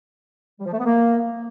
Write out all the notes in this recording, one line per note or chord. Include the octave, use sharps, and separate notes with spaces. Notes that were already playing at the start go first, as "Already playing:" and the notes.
G3
F3
A3
B3
A#3